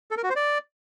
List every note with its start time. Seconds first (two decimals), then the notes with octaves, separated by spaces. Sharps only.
0.11 A4
0.17 A#4
0.23 F#4
0.30 C5
0.36 D5